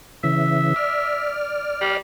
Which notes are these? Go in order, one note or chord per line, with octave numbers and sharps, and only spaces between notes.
C#3 E3 E5
D5 F6
G3